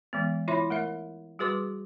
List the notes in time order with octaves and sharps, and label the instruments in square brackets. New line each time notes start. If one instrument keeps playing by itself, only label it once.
[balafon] E3 G#3 B3
E4 F4 C#5 E5 B5 C6
A3 A#4 E5
G3 F#4 G#4 B4 C6 D6